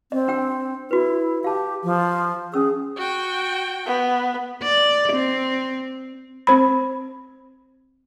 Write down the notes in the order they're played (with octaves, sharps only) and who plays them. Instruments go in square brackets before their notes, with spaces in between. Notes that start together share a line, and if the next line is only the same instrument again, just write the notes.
[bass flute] C4 [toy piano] D#5
[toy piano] D4 G5 E6
[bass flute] E4 [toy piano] F#4 B4
[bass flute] G4 [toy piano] F5 A5
[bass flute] F3
[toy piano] C#4 E6 [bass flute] G#4
[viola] F#4 G5
[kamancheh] B3
[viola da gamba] D5
C4
[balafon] C4 C5 B5